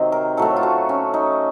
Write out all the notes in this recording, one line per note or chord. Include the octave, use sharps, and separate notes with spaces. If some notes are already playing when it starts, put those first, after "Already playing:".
Already playing: C3 D#3 F#3 C4 F#4 C5 D#5
A#4
A2 F#3 A3 A4
F4
F#4
C#4
D#4